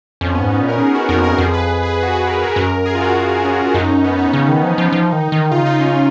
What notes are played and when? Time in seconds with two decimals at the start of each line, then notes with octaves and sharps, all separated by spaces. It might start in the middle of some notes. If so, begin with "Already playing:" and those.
0.21 F2 C#4
0.35 B3
0.40 G#2
0.50 D#4
0.60 A#2
0.68 A#4
0.80 G#4
0.95 F#4
1.09 F2 A#4
1.24 A#4
1.38 F2 G#4
1.54 B4
1.68 G#4
1.83 G#4
2.03 F#4
2.13 G#4
2.27 A#4
2.42 A#4
2.56 F#2 A#4
2.86 G#4
2.95 F4
3.01 F#4
3.44 C#4
3.74 F#2 D#4
3.89 C#4
4.04 B3
4.19 D#4
4.33 C#3
4.48 D#3
4.63 F3
4.78 F3
4.92 F3
5.12 D#3
5.32 D#3
5.51 C#3 F4
5.66 D#4
5.80 C#4
5.95 D#4